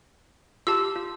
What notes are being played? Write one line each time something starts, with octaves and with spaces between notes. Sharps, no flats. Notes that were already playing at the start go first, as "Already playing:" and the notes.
F4 G4 A5 E6
F4